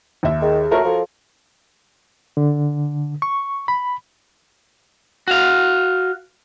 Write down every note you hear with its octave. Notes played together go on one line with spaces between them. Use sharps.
D#2 E5
D#3 G#4
A3 F#4 A#4 C#5
F3 A4
D3
C#6
B5
F#4 F5